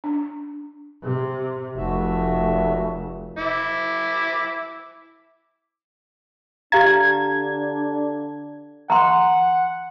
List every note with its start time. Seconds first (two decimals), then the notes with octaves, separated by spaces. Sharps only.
0.04 D4
1.03 C3
1.77 F1 A3 F#4 E5
3.37 E4 D6
6.72 D3 D4 G4 F5 A#5 G#6
8.90 F#5 A#5 C6